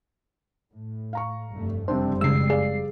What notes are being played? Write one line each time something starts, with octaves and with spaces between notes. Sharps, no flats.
A2
F5 A#5 C#6
F1 G2 A3
F#1 F2 C3 G3 C4 D4 C5
G#1 C#3 G#3 E6 C7
G#4 D5 F5